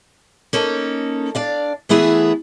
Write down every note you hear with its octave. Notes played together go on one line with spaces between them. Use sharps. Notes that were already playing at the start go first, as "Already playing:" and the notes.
A#3 C#4 D#4 A4
D4 D5 F5
E3 A3 B3 E4 G#4